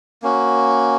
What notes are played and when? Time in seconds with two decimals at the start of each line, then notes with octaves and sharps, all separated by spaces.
0.22 A#3 C#4 F#4